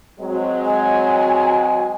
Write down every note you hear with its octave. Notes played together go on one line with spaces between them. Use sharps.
F#3 G#3 C4
G#5